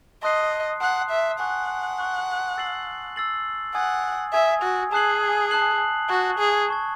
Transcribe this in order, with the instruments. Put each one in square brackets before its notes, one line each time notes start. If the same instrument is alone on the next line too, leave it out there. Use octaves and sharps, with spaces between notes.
[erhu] D#5 [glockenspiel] A5 C6 D#6 F#6 C7
[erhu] F#5 [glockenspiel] A5 C6 D#6 F#6 C7
[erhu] E5
[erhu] F#5 [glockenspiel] G#5 C#6 F#6
[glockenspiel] G#5 C#6 F#6
E6 A6 C7 F#7
E6 A6 C7 F#7
[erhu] F#5 [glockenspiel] G#5 D#6 G#6
[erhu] E5 [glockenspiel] G#5 D#6 G#6
[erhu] F#4
[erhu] G#4 [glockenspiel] A5 D#6 F#6 C7 F#7
[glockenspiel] A5 D#6 F#6 C7 F#7
[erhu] F#4 [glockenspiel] A5 C#6 G#6
[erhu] G#4
[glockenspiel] A5 C#6 G#6